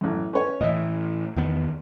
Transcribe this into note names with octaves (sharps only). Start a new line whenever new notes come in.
A1 F#2
C#4 B4 C#5
A2 E3 D#5 E5
E2 D#3 B3